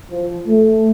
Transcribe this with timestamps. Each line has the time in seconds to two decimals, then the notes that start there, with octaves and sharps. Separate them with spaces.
0.10 F3
0.48 A3